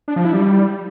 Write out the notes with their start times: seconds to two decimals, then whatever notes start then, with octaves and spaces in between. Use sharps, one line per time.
0.08 D4
0.16 F3
0.25 E4
0.33 G3